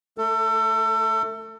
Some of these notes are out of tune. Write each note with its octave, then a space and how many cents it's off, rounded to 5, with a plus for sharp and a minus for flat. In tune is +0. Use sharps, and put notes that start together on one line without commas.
A3 +0 A4 +30